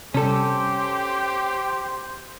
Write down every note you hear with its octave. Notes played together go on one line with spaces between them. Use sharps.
C3 G3 C#4 G4 A4 C5